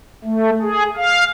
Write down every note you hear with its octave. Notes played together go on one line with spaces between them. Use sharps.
A3
G#4
F5